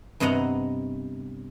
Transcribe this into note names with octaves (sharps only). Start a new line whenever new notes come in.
G2 C3 B3 D#5 F#5 A#5